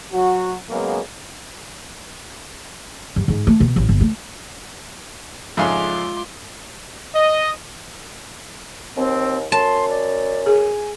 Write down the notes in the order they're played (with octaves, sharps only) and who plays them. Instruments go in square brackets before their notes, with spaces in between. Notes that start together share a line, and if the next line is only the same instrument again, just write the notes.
[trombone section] F#3 F#4
C#3 F#3 G#3 A#3 B3
[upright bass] G2
G#2
A3
B2
A1
G1
A3
[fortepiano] F2 G#2 C#3 [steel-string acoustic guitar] G#3 F4 E5 [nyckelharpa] C6 D6
[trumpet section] D#5
[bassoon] D#2 [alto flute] C4
[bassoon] F#2 [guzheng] A5 [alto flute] C6
[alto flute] D5
[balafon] G#4 [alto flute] G#5